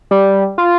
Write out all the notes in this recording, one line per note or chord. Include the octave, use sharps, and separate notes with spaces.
G3
F4